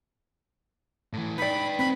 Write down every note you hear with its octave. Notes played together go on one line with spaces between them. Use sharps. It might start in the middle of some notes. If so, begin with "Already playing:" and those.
A2 E3
D#4 B4 D5 G5 B5
C4 B5